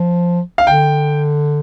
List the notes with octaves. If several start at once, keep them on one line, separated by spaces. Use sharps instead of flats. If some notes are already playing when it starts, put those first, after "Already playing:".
Already playing: F3
F5
D3 G5